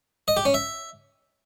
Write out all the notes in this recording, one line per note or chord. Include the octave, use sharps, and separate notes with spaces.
D#5
G4
C#4
E5